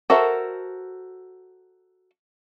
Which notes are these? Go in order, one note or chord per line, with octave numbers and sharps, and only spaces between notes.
F#4 A4 A#4 C5 E5